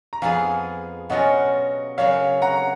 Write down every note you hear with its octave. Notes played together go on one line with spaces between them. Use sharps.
A#5
F2 F3 B3 F4 G#4 F5 G#5
B2 F#3 C#4 F4 D#5 F#5
F#2 C#3 F#3 C#5 F5
F#5 A#5